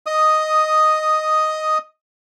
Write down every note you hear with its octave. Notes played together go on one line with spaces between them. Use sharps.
D#5 D#6